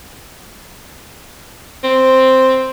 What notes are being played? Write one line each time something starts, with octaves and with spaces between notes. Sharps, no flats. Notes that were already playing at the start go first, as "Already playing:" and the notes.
C4